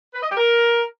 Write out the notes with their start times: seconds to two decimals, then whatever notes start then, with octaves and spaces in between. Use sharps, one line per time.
0.14 B4
0.22 D#5
0.29 G4
0.37 A#4